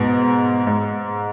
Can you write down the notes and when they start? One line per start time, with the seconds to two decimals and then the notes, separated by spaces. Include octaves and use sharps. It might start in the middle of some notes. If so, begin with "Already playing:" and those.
Already playing: G#2 B2
0.67 G#2